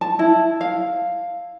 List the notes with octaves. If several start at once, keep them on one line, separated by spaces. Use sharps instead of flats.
A5
E4
F5